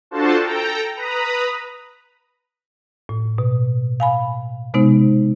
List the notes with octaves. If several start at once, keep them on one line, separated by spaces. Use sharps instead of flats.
D4 F4 F#4 A4 C5 A5
A4 G5 A#5
B4 A#5 B5 D#6
A2
B2
F5 G#5 B5
C3 G#3 B3 D#4 C5